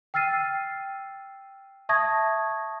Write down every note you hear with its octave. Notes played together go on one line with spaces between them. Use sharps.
G5 E6 F6 A6 C7 D#7
E5 A5 C#6 D#6 G#6 A#6